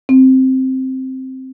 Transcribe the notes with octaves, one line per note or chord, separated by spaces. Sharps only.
C4